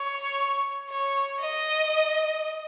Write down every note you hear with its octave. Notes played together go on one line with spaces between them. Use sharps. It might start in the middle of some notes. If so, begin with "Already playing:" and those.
Already playing: C#5
C#5
D#5